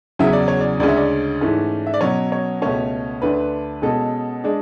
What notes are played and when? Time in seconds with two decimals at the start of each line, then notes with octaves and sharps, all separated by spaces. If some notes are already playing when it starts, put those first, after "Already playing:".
0.19 E2 C#3 F#3 C#4 E5
0.33 D5
0.48 C#5
0.60 D5
0.80 D2 C#3 G#3 C#4 D5
0.88 E5
0.97 D5
1.41 G#2 E3 A3 C#4
1.86 E5
1.94 D5
2.01 B2 F#3 C#4 C#5
2.32 C#5
2.62 C#2 B2 A3 C#4 C#5
3.22 D2 D3 A3 D4 B4
3.82 B2 G#3 C#4 A4
4.44 G#3 D4